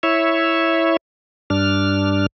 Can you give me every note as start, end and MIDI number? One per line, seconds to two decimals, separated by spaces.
0.03 0.97 64
0.03 0.97 73
0.03 0.97 76
1.50 2.26 43
1.50 2.26 62
1.50 2.26 89